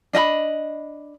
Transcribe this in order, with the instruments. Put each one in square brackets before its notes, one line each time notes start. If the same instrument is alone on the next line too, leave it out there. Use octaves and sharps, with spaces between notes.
[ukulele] D4 D#5 E5 B5